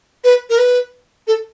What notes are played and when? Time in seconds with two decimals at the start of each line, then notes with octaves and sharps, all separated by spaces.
0.24 B4
0.50 A#4
0.58 B4
1.27 A4